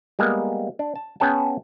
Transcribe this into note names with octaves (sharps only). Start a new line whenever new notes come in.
G3 G#3 A#3 B3
D4
A5
B3 C#4 G#4 G5 A5